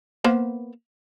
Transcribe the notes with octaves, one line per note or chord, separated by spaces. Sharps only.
A#3 B3 C5